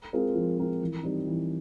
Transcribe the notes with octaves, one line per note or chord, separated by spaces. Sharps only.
G#3 C4 F4 A#4
F3
G#3 C4 F4 A#4
E3
G3 C4 D#4
E3